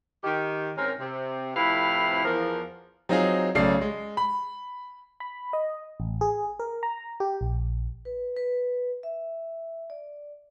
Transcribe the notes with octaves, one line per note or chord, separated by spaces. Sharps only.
D#3 G4
G#2 C4 C#4 A#4
C3
F2 A2 C3 E4 B4 F5
E2 F3 A#4
F#3 C4 D#4 F4 G#4
B1 C#3 A3 D5 C7
G#3
B5
B5
D#5
A1
G#4
A#4
A#5
G4
A#1
B4
B4
E5
D5